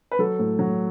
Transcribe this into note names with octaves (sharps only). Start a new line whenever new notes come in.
B4
F#3 A4
A2
F#3